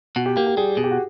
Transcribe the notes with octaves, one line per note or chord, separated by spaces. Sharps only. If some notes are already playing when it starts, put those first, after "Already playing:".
B2 F#4
G4
A#3 G4
G4
G3 G#4
B2 G#4
G4
F#4